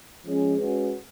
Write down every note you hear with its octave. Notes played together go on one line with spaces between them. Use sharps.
F3 G#3 C#4 G#4
G#3 C#4 F#4 B4